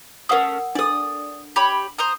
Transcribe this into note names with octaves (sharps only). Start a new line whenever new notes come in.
A3 C#4 A#4 F#5 D#6
D4 A4 D5 D#6
G4 C#5 B5
C5 A#5 D#6